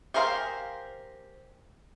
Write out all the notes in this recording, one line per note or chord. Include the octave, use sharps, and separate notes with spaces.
G4 G#4 A#4 C5 F5